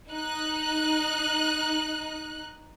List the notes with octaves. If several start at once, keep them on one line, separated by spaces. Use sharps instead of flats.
D#4 F#6